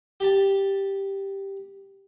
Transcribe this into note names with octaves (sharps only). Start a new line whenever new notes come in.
G4 A5